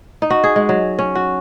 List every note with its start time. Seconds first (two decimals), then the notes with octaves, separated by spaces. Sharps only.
0.22 D#4
0.30 F#4
0.44 G#4
0.56 G#3
0.69 F#3
0.99 C#4
1.15 F#4